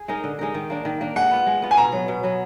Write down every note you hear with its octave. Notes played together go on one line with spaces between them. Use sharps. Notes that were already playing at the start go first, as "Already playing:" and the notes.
Already playing: G#4
G#3 D#4 A#4
D3
G#3 D#4 A#4
D#3
A#3 D4
D#3
A#3 D4
G#3 F#5
B3 F4
G#3
B3 F4
G#5
B2 A#5
F#3 B3
B2
F#3 B3